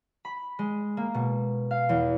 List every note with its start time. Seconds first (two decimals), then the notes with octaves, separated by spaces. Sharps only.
0.25 B5
0.59 G#3
0.97 A#3
1.14 B2
1.71 F5
1.89 E2